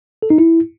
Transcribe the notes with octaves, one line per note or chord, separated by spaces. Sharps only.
A4
D#4
E4